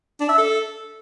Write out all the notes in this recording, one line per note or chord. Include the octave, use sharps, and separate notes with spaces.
D4
E5
A4